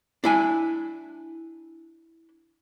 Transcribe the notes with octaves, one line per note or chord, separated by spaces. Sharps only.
D4 E4 G#5